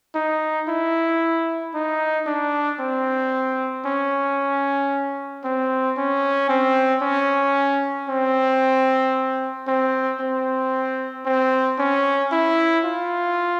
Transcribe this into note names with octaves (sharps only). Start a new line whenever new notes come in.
D#4
E4
D#4
D4
C4
C#4
C4
C#4
C4
C#4
C4
C4
C4
C4
C#4
E4
F4